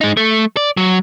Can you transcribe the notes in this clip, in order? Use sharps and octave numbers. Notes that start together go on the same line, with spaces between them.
G#3 D#4
A3
D5
F#3